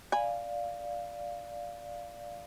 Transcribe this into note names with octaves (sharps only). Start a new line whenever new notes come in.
D5 F5 G#5 B5